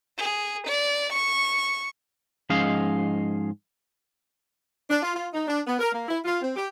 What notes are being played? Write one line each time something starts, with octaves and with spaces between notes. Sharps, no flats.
G#4
D5
C#6
G#2 F3 C#4 G#4 D#5 F5
D4
F4
F4
D#4
D4
B3
A#4
A#3
E4
F4
C4
G4